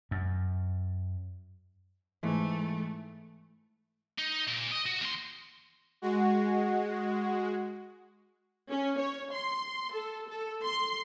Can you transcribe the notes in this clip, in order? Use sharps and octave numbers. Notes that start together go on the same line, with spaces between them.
F#2
G#2 E3 A3
D#4
A#2
D#5
F#4
D#2 C6
G#3 F#4
C#4
C#5
C6
A4
A4
C6